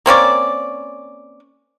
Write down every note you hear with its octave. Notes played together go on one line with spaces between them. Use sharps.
A#3 C4 C#4 D5